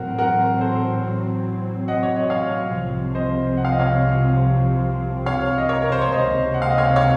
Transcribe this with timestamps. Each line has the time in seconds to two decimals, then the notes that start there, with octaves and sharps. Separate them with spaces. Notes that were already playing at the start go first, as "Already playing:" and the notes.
Already playing: A1 A2 F#3 C4 F#4 A#4
0.18 F#4 A#4
0.61 A4 C5
1.88 D#5 F#5
2.03 C#5
2.16 D#5
2.30 C#5 F5
2.73 C2 C3 F3 C4
3.15 C5 D#5
3.57 F#5
3.65 F5
3.72 D#5
3.79 C#5 F5
5.26 C#5 F5
5.58 D#5
5.69 A#4 C#5
5.82 A#4
5.92 C5
6.02 C#5
6.12 C#2 C3 D#3 A#3 C5 D#5
6.54 F#5
6.62 F5
6.70 D#5
6.78 C#5 F5
6.96 C#5 F5